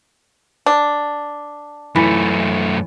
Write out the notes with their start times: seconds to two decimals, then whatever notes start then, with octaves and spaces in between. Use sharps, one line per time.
0.66 D4
1.95 F#2 E3 A3